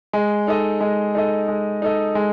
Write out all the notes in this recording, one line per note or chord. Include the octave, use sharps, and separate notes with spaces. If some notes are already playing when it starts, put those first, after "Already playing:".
G#3
D#4 A4 D#5
G#3
D#4 A4 D#5
G#3
D#4 A4 D#5
G#3